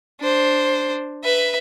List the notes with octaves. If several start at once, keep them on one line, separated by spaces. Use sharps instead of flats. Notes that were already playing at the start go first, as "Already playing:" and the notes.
D4 C5
B4 E5